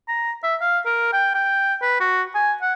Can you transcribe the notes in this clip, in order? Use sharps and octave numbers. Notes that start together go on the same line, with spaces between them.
A#5
E5
F5
A#4
G5
G5
B4
F#4
G#5
F#5